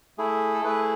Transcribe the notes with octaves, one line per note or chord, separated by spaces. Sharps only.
A3 E4 G#4
A4
A3 E4 G#4 B4